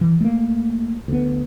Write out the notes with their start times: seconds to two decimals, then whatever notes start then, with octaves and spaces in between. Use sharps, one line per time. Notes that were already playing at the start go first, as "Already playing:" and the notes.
0.01 E3
0.21 A3 A#3
1.08 D2 B3